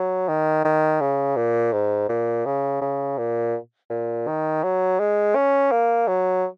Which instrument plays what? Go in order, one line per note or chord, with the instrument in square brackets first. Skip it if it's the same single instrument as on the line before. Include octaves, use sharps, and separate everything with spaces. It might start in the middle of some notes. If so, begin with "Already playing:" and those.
Already playing: [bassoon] F#3
D#3
D#3
C#3
A#2
G#2
A#2
C#3
C#3
A#2
A#2
D#3
F#3
G#3
C#4
A#3
F#3